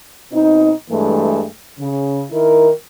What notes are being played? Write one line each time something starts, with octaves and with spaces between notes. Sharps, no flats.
B2 C4 D#4
G2 E3 G#3 A3
C#3
D#3 E4 A#4